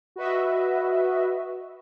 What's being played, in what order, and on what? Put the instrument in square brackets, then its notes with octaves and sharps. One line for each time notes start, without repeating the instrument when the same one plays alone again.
[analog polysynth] F#4 B4 D#5 E5